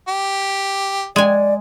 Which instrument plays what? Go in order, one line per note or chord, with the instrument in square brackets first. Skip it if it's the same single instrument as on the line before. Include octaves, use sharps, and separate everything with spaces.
[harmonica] G4
[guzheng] G#3 G#5 [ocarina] D5